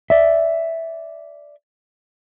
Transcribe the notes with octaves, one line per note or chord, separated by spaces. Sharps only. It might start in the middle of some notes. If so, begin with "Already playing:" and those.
D5 E5